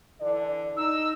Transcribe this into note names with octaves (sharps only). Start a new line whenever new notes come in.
D3 E3 D5
D#4 E6